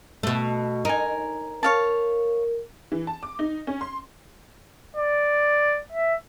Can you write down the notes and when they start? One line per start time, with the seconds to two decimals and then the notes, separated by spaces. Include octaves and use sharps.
0.23 B2 A3
0.85 D#4 A#4 G#5
1.63 A#4 C#5 F5 A5
2.92 E3
3.07 A5
3.23 D6
3.39 D#4
3.67 C#4
3.81 C6
4.97 D5
5.92 E5